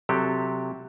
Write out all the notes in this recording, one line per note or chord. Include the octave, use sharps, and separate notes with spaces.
C3 F#3 G4 A4